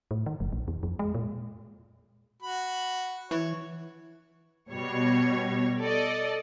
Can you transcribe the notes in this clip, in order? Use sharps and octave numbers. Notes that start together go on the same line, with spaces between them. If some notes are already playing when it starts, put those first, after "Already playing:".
A2
D#3
F#1
A#1
E2
F2
G#3
A#2
F#4 B5
E3 C#5
B2 G3 C#5
A4 D5 D#5